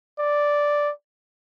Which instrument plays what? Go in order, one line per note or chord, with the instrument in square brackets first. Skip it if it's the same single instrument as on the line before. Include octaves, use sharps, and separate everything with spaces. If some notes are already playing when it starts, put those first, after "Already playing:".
[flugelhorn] D5